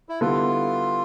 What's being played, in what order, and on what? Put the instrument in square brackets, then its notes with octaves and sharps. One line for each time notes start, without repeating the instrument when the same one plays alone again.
[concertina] E4
[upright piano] D3 G3 B3 E4 A4 [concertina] F4